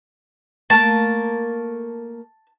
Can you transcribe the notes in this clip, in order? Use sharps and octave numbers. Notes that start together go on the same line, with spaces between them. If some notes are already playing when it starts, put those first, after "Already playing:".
A3 A#3 A#4 A5